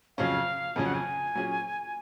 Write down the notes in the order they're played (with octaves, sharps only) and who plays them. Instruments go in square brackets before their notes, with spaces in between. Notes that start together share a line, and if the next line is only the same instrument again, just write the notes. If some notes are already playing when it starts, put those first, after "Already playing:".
[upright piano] F2 C#3 F#3 C#4 [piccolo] F5
[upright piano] F2 C#3 F#3 C#4 [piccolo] G#5
[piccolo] F#5
G#5
[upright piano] A#2 F#3 C#4 G#4